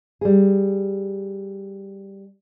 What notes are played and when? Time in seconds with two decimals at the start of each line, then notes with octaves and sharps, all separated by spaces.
0.21 G3 G#4